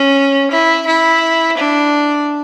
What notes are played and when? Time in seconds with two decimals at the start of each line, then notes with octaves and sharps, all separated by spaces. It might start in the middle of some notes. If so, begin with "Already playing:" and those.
Already playing: C#4
0.51 E4
0.86 E4
1.57 D4